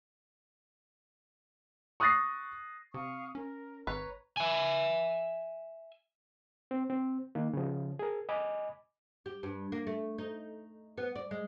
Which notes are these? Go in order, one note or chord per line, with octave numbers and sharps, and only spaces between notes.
C#6 D#6 F#6 A6 A#6 C7
C3 F5 C#6 D#6
C#4 A#4
G#1 B4 C#5 A#5
E5 G#5
C4
C4
D#3 A#3
C#3 F3
G#4 A#4
D#5 G#5 B5 D6
G4
G2
A#3
A3
D#4
B3
D5
G#3